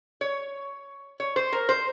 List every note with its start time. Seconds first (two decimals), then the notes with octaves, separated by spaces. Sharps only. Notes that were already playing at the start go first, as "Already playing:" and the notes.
0.21 C#5
1.20 C#5
1.36 C5
1.52 A#4
1.69 C5